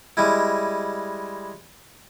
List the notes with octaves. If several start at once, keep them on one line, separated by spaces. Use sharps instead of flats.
G3 G#3 E4